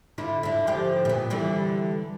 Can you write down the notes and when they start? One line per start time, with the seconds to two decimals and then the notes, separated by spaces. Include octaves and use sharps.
0.18 D3 E4 F4
0.43 D3 E4
0.67 D3 F3 G4
1.05 A#2 B3
1.30 D3 E3 G3